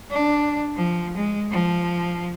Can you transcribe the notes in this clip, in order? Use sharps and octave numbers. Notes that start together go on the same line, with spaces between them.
D4
F3
G#3
F3